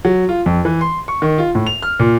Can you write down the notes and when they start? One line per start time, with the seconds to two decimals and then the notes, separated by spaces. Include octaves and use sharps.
0.05 F#3
0.29 F4
0.46 F2
0.65 E3
0.81 C6
1.08 C#6
1.22 D#3
1.38 F4
1.55 A2
1.67 F7
1.82 F6
2.00 A#2